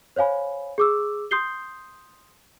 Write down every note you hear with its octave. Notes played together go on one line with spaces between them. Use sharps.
C5 C#5 F5 G#5 B5
G#4 D6 E6
C6 D#6 G6 C7 G7